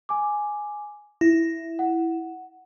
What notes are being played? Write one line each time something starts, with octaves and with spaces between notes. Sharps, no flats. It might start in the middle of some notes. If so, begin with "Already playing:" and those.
G#5 D6
E4 A#6
F#5